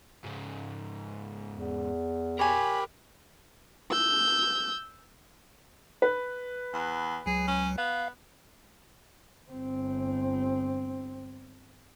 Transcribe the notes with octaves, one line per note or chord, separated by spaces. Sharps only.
G#2 C#3
E2
G4 A#4 C5 C#5 G#5 B5
E6 G6
B4
E2
C#2 F#3 G#4
C#4
B3 F5
G1 C4